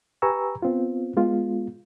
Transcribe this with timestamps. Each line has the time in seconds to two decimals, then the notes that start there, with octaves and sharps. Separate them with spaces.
0.22 G4 B4 G#5 A#5 C#6 E6
0.62 B3 C4 F4
1.17 G#3 B3 F4